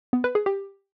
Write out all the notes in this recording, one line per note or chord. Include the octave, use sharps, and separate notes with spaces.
B3
B4
G#4
G4